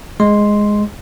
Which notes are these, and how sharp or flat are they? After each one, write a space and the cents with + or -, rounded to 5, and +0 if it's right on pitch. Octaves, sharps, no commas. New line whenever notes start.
G#3 +0 C6 +0